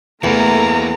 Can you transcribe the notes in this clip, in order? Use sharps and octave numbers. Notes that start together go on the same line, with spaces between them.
E2 E3 A3 A#3 A#5